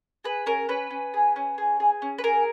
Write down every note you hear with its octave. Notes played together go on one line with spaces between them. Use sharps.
G#4 B4
C#4 A#4
C#4 B4
C#4
G#4
C#4
G#4
G#4
C#4
B4
G#4 A#4